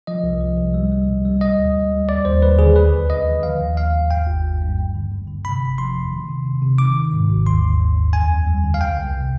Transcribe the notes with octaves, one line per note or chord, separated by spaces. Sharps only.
F3 D#5
C2
F3
C2
G3
G3
B2
G3
G3 D#5
D2
D2
G3
D#2 D5
D#2 C5
D#2 B4
D3 G#4
D2 B4
D2
D2 D#5
D#3
F3 F5
D#2
D#2 F5
D#2
G2 G5
G1
G2
G2
G2
D3
G2
D3
C3 B5
G1
F3 C6
F2
D#3
C3
C3
C3
D#3 D6
D#3
G#2
G#1
D#2 C6
D3
D#2
D#2
F2 G#5
F2
G3
D3
F5
C2 G5
C2
C3